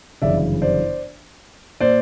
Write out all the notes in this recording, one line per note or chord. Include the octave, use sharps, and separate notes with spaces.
G1 F#2 C#3 E3 D5 E5
C5 D5
A#2 C5 D5